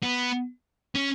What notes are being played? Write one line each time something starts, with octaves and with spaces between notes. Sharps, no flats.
B3
C#4